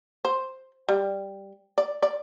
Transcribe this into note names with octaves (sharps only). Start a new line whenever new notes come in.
C5
G3
D5
D5